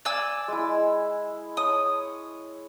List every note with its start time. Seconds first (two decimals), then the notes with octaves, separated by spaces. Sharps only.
0.05 D5 G#5 E6
0.48 G#3 E4
1.57 C#5 D#6